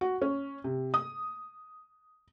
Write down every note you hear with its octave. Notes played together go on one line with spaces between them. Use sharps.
F#4
C#4
C3
D#6